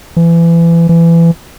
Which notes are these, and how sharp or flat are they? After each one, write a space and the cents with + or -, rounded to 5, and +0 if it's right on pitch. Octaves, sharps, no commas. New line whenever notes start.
E3 +30
E3 +25